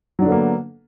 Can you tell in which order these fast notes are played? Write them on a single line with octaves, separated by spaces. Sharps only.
F#3 D4 D3 B3 A#3